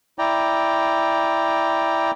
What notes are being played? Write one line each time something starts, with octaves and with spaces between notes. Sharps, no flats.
E4 D5 G5 A#5